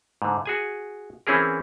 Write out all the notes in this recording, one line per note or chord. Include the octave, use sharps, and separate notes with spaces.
G#2 D3
F#4 G#4 G#5
E3 C4 C#4 E4 G#4 A#4